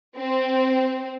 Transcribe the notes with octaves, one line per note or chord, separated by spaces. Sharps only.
C4